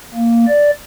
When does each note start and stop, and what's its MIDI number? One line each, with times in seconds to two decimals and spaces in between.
0.14 0.46 58
0.48 0.71 74